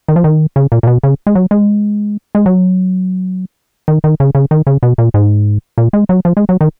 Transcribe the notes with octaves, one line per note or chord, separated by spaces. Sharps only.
D#3
F3
D#3
C#3
A#2
A#2
B2
C#3
G#3
F#3
G#3
G#3
F#3
D#3
D#3
C#3
C#3
D#3
C#3
B2
A#2
G#2
A#2
G#3
F#3
F3
G#3
F#3
D#3